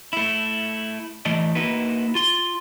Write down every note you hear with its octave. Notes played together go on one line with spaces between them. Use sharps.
A3 E4
E3 A3 D5 D#5
A#3 D#4 E4 F#4 B4
F4 C6